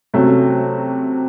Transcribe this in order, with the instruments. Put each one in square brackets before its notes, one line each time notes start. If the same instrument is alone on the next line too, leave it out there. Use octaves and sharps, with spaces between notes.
[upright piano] C3 F#3 A3 C#4 F#4